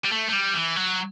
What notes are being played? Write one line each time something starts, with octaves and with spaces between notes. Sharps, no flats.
G3
A3
A3
G3
E3
F#3